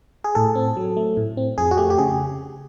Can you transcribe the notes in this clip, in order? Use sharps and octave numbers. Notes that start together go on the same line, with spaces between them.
G#4
A2 A4
C4
F#3
A3
A2
C4
F2 G#4
F#4
A3 G4
G4
C#3 G#4